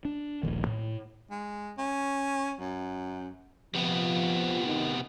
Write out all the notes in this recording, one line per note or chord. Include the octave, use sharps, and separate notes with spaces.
D4
D#1 A#1 D#3
A2
G#3
C#4
F#2
C3 F3 B3
D#3